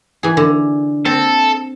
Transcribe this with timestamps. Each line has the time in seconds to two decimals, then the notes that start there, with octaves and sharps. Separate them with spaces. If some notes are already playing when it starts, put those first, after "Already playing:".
0.23 E3 G#4
0.37 D3
1.05 C4 A4